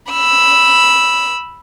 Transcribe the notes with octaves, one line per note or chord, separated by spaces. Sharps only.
B5 E6